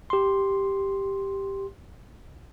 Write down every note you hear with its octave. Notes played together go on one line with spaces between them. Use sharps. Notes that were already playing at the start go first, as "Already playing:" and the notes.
G4 C6